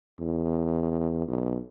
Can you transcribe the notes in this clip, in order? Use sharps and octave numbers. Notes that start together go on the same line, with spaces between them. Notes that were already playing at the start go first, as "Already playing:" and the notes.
E2
B1